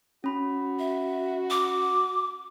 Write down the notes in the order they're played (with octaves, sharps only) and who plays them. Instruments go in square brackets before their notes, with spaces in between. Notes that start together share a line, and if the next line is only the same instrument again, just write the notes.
[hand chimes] C#4 B5 [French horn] F#4
[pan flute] E5
D6